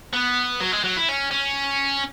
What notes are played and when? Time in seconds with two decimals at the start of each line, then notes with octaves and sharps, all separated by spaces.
0.14 B3
0.61 F#3
0.73 G#3
0.84 F#3
0.97 E4
1.09 C#4
1.31 C#4